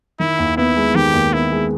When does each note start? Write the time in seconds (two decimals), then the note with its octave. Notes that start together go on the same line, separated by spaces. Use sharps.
0.20 D#3 E4
0.39 D#2
0.57 B3 E4
0.77 G#3
0.95 D#3 G4
1.14 D#2
1.33 B3 E4
1.52 G#3